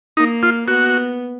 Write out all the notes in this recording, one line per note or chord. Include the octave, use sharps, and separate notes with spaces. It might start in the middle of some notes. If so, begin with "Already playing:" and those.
A#3 D#4
F4
B3 F#4